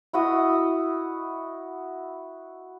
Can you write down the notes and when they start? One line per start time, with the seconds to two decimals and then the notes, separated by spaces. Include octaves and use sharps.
0.13 E4 F#4 D#5 D#6